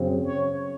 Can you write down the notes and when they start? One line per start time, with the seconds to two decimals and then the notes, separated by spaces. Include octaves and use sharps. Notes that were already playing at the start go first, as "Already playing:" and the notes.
Already playing: F#2 C#3 F#3 C4
0.26 C#5